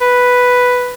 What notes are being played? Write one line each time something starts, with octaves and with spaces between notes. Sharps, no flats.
B4